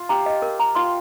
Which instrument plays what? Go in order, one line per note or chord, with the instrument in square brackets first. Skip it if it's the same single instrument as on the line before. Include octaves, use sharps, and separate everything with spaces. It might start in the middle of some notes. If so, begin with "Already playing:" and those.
Already playing: [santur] F4
[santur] G4 [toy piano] A#5
[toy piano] D#5
A#4
A#5
[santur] F4 [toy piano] C6